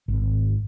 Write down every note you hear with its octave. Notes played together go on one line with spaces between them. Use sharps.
G#1